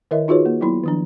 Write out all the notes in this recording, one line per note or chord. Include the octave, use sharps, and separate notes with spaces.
D#3 E4 A#4 C#5 D#5 E5
D#4 F4 F#4 G#4 B4 C#5
A#3
F#3 B3 E4 B5
D#3 F3 D4